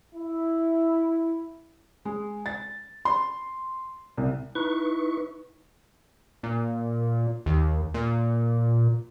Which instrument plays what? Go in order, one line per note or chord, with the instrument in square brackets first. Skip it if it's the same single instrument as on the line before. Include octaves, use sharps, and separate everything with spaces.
[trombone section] E4
[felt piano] G#3
A6
C6
C2
[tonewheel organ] D#4 E4 B4 C#6
[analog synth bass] A#2
D#2
A#2